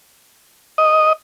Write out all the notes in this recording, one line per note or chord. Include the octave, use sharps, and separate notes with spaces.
D#5